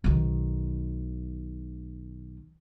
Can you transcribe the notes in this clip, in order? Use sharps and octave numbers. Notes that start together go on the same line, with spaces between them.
B1 D#3